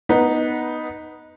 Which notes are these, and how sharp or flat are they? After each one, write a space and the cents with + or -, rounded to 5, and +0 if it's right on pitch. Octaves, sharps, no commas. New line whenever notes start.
B3 +0 D#4 +0 B4 -15